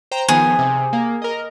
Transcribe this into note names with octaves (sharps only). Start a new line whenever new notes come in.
C5 G5 A#5
D#3 F3 B3 G#4
C3
A#3
A#4 D#5